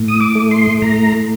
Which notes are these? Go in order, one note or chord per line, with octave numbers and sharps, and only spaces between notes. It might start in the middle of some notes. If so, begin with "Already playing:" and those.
Already playing: A2
D#6
D6
A3
C6
A2 A#5